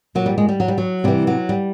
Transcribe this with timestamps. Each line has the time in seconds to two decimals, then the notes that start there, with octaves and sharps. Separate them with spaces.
0.15 A#2 F#3
0.26 G3
0.38 G#3
0.49 G3
0.60 F#3
0.68 G3
0.78 F#3
1.04 C3 E3 G3
1.27 F#3
1.49 G3